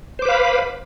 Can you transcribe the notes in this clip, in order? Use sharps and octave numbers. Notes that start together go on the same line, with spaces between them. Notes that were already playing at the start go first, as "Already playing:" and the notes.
B4 C5 F5 B5 D6